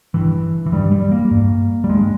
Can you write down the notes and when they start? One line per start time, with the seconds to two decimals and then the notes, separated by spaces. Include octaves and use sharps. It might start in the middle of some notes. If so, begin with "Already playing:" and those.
0.14 G2 E3
0.66 E3
0.72 G2 G3
0.92 G3
1.11 A#3
1.31 G2
1.84 G3
1.90 G2 G#3